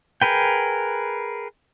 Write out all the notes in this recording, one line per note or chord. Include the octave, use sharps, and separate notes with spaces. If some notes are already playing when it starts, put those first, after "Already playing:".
G#4 A#4 B4 G5